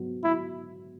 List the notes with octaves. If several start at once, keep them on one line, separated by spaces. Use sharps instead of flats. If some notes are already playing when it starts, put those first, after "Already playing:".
Already playing: G#2 F#3 B3
F#3 E4